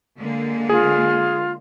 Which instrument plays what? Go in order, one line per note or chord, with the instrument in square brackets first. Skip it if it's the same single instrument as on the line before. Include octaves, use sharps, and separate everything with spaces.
[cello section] D3 G#3 A#3
[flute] F4 [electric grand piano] G#4